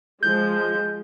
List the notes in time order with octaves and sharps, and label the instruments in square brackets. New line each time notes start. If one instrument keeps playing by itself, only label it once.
[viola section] F3 G#3 [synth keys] G6